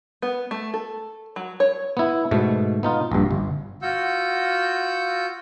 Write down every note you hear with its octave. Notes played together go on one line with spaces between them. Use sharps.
B3
A3
A4
F#3
C#5
B3 E4
G#2 B2 A3
B3 D#4 F4
A#1 G2
G1
F4 F#4 F#5 E6 G6